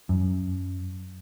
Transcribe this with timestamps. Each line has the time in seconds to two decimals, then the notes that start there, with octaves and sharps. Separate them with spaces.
0.09 F#2